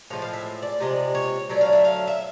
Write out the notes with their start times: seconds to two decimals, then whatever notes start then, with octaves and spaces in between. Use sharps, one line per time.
0.10 A2 F3 G#3 F5
0.22 F5
0.33 E5
0.62 D5
0.80 C3 F3 G#3
1.15 C#5
1.49 D3 F#3 A3 D5
1.61 F5
1.73 E5
1.85 F5
2.08 E5